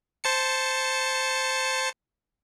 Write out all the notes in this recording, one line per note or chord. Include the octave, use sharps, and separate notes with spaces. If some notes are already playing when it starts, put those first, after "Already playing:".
C5 A5 C#7